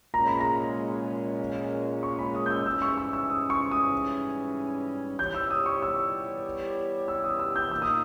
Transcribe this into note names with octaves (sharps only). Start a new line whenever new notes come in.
A#2 G#3 C#4 A#5
B5
A#5
C#6
B5
D#6
G6
E6
G#2 E3 G3 C#4 G#4 E6
C#6
E6
E6
D#6
C#6
D#6
E3 G3 B3 G4 C#5 G6
E6
D#6
C#6
E6
E6
D#6
E6
G6
A#2 A#3 D#4 E6
D#6